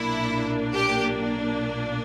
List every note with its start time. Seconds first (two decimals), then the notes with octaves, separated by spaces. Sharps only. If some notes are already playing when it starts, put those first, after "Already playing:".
Already playing: B1 A#2 A#3 D4 E4
0.73 G4